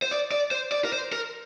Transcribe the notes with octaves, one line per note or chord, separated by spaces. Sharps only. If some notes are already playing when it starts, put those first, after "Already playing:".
C5
D5
D5
C5
D5
A#4
C5
A#4